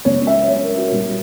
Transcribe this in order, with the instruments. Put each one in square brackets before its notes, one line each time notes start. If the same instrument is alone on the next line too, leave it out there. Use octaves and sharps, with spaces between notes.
[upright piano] C#2 C#3 F#3 C#5
E5
C#5
A#4
F#4
A#2 G3 A#3